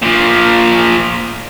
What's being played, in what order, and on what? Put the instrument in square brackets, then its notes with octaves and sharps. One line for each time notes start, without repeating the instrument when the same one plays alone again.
[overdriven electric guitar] A#2 F3